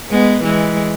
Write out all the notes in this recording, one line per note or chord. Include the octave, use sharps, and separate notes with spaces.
G#3 B3
E3 G#3